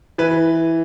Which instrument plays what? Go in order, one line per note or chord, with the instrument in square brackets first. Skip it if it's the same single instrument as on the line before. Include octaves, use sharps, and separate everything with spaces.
[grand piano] E3 B4